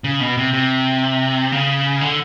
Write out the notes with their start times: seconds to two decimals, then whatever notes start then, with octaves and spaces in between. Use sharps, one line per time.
0.04 C#3
0.20 B2
0.37 C3
0.53 C3
1.52 C#3
2.01 D3